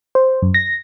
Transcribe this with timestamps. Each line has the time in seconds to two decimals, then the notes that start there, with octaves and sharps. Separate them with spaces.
0.15 C5
0.42 F#2
0.54 A#6